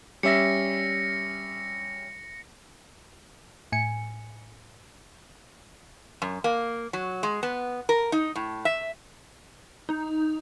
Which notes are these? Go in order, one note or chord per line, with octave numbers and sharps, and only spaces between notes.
G3 C#4 E5 A#6 C#7
A2 G#5 C#7
F#2
A#3
F#3
G#3
B3
A#4
D#4
A2
E5
D#4